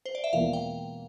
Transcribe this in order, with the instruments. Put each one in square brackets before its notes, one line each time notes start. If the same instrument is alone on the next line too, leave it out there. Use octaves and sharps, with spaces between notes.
[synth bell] C5
D5
E5
[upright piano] E1 E2 E3 A#3 F4 [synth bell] F5
[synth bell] G5